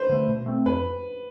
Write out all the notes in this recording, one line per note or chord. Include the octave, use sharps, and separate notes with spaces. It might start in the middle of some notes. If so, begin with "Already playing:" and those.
Already playing: B4 C5
D3 A3
B2
A3 C4
F2 B4